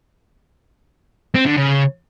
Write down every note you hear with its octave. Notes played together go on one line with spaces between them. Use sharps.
C4
D3
C#3